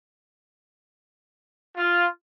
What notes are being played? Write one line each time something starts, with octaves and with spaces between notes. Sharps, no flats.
F4